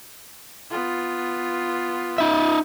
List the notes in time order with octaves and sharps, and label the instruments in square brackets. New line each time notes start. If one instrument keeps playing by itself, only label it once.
[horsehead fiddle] B3 F4
[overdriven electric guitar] D#4 E5